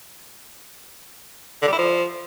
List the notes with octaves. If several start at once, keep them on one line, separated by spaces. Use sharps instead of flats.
D3
G3
E4
F3